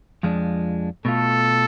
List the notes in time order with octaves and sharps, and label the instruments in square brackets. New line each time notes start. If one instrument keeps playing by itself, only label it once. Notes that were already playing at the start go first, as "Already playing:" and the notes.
[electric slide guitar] F2 F3 G#3 D4
[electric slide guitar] B2 A3 F4 [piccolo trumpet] A4